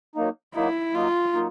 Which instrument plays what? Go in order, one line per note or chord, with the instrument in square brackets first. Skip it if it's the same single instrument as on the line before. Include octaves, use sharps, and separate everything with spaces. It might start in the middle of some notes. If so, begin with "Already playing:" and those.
[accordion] F#3 A#3 D#4
[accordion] F#3 A#3 D#4 [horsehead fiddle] E4
[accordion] F#3 A#3 D#4 [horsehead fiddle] F4
[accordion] F#3 A#3 D#4